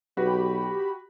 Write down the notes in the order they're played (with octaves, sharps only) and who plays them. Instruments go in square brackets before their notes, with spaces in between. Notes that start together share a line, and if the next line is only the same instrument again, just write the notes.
[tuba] B1 [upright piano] F#4 B4 [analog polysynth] G4 B5